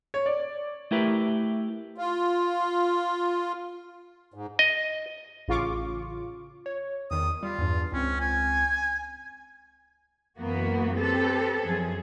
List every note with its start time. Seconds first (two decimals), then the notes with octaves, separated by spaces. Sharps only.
0.14 C#5
0.26 D5
0.91 A3 E4 G4 A#4 B4
1.98 F4
4.34 G#2
4.59 D#5
5.48 A1 C#3 F4 C#6 D6
6.66 C#5
7.11 E2 D#3 D#6
7.43 G3 F4
7.59 E2 G2
7.92 C#2 C4 C#4
8.20 G#5
10.37 F#2 E3 A#3 B3 F#4
10.95 C4 G4 A4 B4
11.65 F#2 F3 G#4